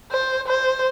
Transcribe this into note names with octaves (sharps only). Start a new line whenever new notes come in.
C5
C5